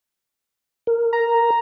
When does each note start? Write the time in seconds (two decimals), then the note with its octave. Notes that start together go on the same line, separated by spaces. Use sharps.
0.87 A#4
1.13 A#5